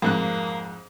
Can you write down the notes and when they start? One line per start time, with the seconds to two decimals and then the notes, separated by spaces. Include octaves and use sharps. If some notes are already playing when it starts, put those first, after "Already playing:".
0.02 F2 G#2 A#3 F#6